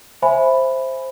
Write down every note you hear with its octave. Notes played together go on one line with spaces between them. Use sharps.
C5 E5 G#5 B5